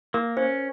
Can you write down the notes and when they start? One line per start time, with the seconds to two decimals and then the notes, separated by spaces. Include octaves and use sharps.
0.14 A#3 A#4
0.37 C#4 C5